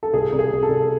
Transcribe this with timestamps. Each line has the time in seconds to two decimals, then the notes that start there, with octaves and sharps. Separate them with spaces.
0.03 A4
0.13 C2 G#4
0.33 C2
0.39 G#4
0.51 C2
0.63 A4
0.69 C2